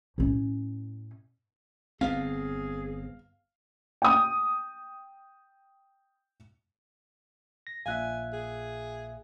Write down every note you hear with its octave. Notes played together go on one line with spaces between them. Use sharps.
A2 C#4
G1 B3 C4 G#4 F5
G5 D#6
A#6
A#1 A#2 E5 F5 G#5 F#6
G#4